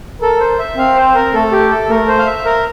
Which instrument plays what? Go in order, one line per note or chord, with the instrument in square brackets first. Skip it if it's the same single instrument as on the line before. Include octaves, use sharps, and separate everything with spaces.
[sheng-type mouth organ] A4 [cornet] A#4
[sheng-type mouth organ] C5
E5
[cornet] C4 [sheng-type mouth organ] F5
[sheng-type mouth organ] C5
A#4
[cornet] A3 [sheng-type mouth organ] A4
[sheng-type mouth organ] G4
A4
[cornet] A3 [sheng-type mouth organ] A#4
[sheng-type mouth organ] C5
F5
E5
A#4